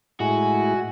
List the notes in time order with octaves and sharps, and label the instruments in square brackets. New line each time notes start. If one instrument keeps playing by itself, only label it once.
[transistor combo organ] A2 G#3 E4 [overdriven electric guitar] F#4 [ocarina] G#5